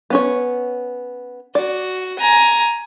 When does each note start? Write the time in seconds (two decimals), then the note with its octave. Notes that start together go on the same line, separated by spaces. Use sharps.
0.10 B3 C#4 C#5
1.55 F#4 D5
2.19 G#5 A#5